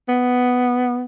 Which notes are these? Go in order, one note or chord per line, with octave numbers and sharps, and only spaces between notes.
B3